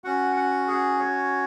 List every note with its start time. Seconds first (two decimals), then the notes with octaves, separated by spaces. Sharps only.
0.04 C#4 F#4 F#5
0.36 F#5
0.67 G#4
0.99 C#5